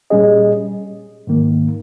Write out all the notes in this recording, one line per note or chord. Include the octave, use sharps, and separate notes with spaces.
A#2 G3 C#4 G#4 D#5
G#2 D#3 A#3